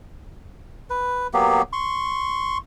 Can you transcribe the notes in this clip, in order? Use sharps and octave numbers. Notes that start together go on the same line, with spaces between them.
B4
F#3 A#3 B3 G4
C6 C#6